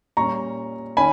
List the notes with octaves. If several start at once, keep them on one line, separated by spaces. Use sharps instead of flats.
A#2 G3 C#4 A#5 C#6
D#3 C#4 G#5 B5